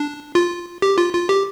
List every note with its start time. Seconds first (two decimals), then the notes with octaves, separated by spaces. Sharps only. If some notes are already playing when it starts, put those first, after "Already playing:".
Already playing: D4
0.35 F4
0.82 G4
0.98 F4
1.13 F4
1.29 G4